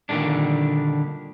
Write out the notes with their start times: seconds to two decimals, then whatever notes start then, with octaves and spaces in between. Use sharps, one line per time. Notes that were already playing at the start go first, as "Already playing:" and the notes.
0.09 A#2 D3 D#3 G3 G#3 D4